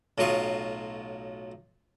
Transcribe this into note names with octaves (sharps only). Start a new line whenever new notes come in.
B1 A2 F#3 F4 C#6 D#6